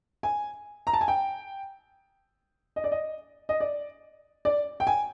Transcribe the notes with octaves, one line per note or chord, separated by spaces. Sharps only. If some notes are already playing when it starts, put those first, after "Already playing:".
G#5
A#5
A5
G#5
G5
D#5
D5
D#5
D#5
D5
D5
G5
G#5